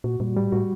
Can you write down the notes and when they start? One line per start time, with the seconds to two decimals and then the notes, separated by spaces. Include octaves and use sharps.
0.04 A#2 F#4
0.20 A#2 G3
0.36 A2 G3
0.52 A2 F#4